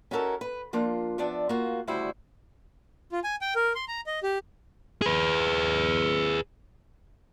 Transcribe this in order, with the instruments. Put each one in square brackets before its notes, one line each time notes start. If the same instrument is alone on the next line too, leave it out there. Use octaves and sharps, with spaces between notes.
[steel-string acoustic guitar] C#4 D#4 E4 F#4 A4 A#4
B4
F3 A#3 D4 F4
F3 B3 D4 D5 E5
A#3 F4 F#4
D2 C#3 G3 E4 F#4 C5
[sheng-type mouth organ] F4
G#5
G5
A#4
C6
A#5
D#5
G4
[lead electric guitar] G#4 B4